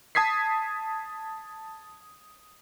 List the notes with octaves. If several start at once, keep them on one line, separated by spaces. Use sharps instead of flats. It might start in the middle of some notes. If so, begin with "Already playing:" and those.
A5 D#6 G#6 B6 C7